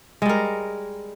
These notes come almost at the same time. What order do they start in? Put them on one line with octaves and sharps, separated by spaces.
G#3 G3 A#4